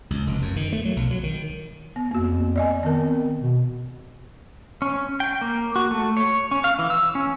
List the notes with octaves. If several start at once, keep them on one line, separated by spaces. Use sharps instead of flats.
C#2
F1
F#2
D#3
A3
F#3
B1
F#3
D#3
B3
F2 A#3 F#4
D5 D#5 G#5
D#3 B3 C4 A#4
B2
C#4
G5
A#3
F#4
A3
C#5
C#4
F5
E3
E6
C#4